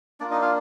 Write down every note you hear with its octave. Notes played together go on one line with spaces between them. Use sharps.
A#3 D4 F4 D5
D#4 D#5
F4 F5